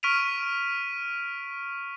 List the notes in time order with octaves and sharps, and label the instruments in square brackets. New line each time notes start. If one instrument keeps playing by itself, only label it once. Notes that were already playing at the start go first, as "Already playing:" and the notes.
[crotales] C#6 F6 B6 D7 D#7 F7